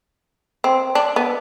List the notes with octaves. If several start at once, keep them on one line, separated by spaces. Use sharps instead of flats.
C4
D4
B3